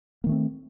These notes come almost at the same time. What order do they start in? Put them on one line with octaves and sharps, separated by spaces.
A#3 D#3 A3 C4